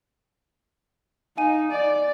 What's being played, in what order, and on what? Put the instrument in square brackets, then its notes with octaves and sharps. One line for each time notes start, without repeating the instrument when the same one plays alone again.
[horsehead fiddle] D#4 [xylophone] F5 G#5 D#7
[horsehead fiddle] D5